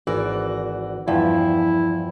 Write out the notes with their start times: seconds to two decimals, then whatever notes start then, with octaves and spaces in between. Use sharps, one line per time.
0.07 G#1 E3 F#4 A#4 D5
1.08 E2 G2 F3 E4